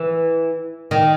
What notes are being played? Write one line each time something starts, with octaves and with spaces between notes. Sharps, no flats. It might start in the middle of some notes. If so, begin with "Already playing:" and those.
Already playing: E3
D#3